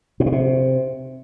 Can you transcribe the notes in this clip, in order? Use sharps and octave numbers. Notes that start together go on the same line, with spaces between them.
A2
B2
C3